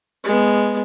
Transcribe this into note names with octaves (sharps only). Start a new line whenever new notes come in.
G#3 B3